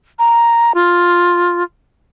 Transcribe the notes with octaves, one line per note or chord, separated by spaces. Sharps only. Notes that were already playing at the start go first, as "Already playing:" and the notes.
A#5
F4